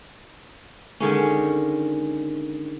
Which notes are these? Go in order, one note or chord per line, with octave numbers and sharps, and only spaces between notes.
D3 D#3 G#3 C#4